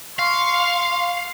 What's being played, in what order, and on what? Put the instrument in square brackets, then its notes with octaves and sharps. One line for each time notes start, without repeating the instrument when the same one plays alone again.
[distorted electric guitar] F5 [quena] C6 [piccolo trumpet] C#6